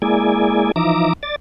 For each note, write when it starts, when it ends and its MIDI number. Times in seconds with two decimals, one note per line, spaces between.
0.02 0.72 56
0.02 0.72 58
0.02 0.72 64
0.02 0.72 68
0.02 0.72 74
0.02 0.72 80
0.76 1.13 52
0.76 1.13 53
0.76 1.13 63
0.76 1.13 76
0.76 1.13 82
0.76 1.13 86
1.23 1.36 74
1.23 1.36 93